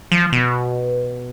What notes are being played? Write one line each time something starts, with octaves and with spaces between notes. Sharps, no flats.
F3
B2